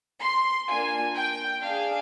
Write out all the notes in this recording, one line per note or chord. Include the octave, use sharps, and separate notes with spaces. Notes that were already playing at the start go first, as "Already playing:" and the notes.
C6
A#3 D4 F4 G#5
G5
D4 G#4 F5